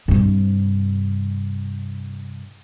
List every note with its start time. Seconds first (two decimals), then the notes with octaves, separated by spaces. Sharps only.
0.08 G2 C3